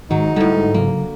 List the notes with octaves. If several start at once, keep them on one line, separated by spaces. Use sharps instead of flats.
G#2 D#3 F#3 D#4
A2 D3 G3
C#3 F#3 A#3